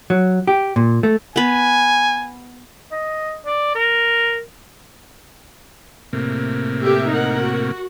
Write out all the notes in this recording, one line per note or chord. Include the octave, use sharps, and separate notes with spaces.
F#3
G4
A#2
A3
B3 B4 G#5
D#5
D5
A#4
A2 C3 A#3
G4 A4 E5
D#4 A#4 F#5
F#4